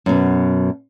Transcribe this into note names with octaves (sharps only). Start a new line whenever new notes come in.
F#2 B2